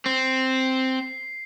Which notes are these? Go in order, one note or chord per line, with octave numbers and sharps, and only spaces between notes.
C4 C7